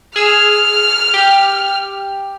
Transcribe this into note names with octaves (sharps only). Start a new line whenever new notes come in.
G#4 E6 F6
G4